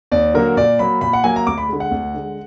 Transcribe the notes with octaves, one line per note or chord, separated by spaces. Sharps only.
D#2 D5
D3 F#3 A#3 A#4
A#2 D5
F#3 A#3 B5
A#2 B5
F#5
F#3 A#3 G#5
A#5
D2 D6
B5
D3 G#3
F#5
D2
D3 G#3